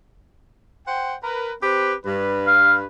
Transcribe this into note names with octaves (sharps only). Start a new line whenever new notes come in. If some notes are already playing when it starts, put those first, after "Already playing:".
C5 F#5 G5
A#4 B4
C4 G4 B4
G2 B4
F5